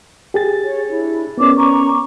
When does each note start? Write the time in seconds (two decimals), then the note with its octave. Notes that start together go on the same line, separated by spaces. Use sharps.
0.34 G4 G#4 A6
0.63 C#5
0.87 D4 E4
1.38 B3 C#4 A#4 D5 D6
1.55 A#5 C#6